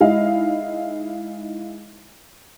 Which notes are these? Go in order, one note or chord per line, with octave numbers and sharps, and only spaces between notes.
G#3 D#4 E4 D#5 F5